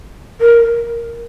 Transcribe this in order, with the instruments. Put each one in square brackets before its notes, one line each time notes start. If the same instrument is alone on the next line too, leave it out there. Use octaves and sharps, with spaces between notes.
[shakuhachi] A#4